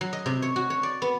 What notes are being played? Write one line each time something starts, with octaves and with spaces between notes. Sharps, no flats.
F#3
D#5
C3
C#5
F#4
C#5
D5
B3